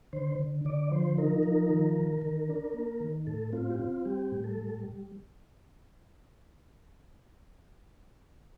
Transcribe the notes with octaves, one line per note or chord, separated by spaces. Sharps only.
D3 C5
D3
D3 D5
F3 C5
D#4 A#4
F3 A#4
D#3
D#3
D#3
D4
A#3
D#3
A2 A4
C4 F4
G4
C4 F4
G3 G4
A2
A4
G3